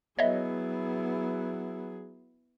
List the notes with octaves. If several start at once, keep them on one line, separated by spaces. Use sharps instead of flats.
F#3 B3 E4 G#4 C#5 D#5 E5